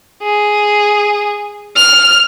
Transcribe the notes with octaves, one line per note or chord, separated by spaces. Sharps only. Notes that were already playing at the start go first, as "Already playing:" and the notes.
G#4
F6